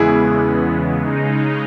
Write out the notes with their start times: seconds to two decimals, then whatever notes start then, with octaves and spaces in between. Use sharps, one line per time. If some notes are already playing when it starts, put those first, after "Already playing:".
Already playing: E2 C#3 E3 G#3 B3 E4 G#4
1.02 C#3 G#3 D#4